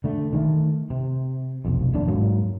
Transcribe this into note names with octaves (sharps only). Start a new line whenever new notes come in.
D3 A3
D#3 F#3 A3
C3
F1 B1 F2
D#1 A#1 A2 D4
G#2 F#3 A#3